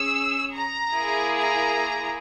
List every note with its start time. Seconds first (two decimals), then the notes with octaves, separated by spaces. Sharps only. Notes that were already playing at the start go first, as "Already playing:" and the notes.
Already playing: C#4 G#4 E6
0.53 A#5
0.93 A#3 E4 G#4
1.32 A#5